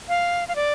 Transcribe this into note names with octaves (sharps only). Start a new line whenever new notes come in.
F5
F5
D5